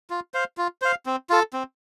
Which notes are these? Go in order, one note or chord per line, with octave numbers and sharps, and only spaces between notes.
F4
C5 F5
F4
C5 F5
C4
F4 A4
C4